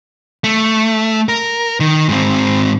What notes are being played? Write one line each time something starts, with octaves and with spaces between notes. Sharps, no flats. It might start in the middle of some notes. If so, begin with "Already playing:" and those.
A3
A#4
D#3
G#2 C4